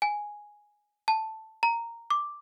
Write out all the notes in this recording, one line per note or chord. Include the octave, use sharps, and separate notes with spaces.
G#5
A5
A#5
D6